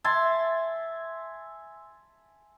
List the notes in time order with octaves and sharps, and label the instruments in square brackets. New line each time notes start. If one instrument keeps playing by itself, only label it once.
[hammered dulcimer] E5 G#5 A5 C6